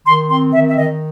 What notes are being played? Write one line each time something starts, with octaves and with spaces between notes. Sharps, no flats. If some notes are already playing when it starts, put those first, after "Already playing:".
D#3 C6
C4 C6
D#3 E5
E5
D#3 D#5